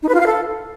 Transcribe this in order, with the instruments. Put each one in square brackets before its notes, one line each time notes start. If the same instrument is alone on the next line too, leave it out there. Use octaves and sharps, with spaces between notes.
[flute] D#4
B4
F4
F5
A4